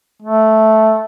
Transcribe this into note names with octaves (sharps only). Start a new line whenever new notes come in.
A3